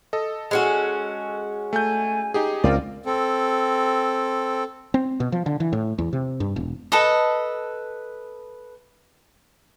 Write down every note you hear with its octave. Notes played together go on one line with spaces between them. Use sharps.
A4 D#5
G#3 C#4 F#4
A3 G#5 G6
D#4 G4 G#4
C#2 C4 F4 A#4 D5
C4 A4
C4
B2
F3
D3
E3
A2
E2
C3
G2
E1
A4 B4 D#5